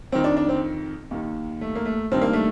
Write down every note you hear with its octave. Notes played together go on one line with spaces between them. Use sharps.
F2 D#3 C4
D4
D4
C4
D#2 D#3
A3
A#3
A3
G2 D#3 C4
A#3
A3